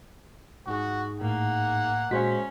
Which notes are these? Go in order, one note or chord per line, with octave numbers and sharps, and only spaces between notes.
G#2 D#4 F#4 G#4
A2 A#3 F#5
A#2 G#3 C#4 F#4 C5 F5 B6